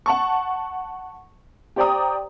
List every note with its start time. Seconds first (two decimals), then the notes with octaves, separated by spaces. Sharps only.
0.06 F#5 A5 C#6
1.76 G4 C5 D5 G5 A#5 D#6